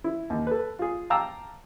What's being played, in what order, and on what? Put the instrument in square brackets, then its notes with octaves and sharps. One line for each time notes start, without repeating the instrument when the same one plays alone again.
[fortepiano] E4
D#2
A4 B4
F4 G#4
F5 G5 A5 A#5 D6 E6